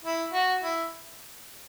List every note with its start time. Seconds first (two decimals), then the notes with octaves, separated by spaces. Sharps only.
0.04 E4
0.33 F#4
0.63 E4